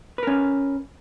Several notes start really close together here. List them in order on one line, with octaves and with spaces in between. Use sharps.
B4 A#4 C#4